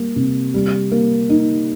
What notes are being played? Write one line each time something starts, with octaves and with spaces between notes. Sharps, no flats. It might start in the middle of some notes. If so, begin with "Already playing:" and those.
Already playing: G3 A#3
C3
G3
A#3
D#4